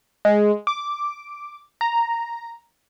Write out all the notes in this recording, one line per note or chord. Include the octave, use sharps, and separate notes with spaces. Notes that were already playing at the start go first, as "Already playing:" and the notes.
G#3
D6
A#5